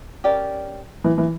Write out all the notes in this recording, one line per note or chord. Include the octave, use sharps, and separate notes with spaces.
C#4 G4 A#4 D5
E3
E3